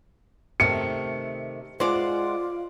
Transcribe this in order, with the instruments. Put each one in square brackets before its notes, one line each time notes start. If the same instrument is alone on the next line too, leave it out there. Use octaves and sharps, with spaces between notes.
[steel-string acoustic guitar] C3 D#3 A3 [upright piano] C#7
[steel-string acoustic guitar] G#3 F#5 [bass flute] F4 [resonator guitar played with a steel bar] C5 D5